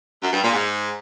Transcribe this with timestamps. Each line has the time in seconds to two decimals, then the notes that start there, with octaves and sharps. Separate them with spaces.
0.23 F#2
0.33 G2
0.43 A#2
0.53 G#2